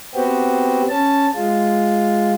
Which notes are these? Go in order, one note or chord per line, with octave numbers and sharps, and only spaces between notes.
B3 C4 F#4 G4
C#4 A5
G#3 F4